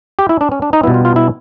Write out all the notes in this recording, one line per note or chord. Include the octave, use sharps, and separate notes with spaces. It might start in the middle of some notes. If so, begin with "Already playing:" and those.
G4
E4
D4
C#4
D4
D#4
B2 G3 B3 E4
F4
F4
E4